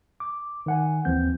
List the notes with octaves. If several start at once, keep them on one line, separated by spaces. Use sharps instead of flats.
D6
D#3 F#5 G#5
D#2 E3 F3 C4 G6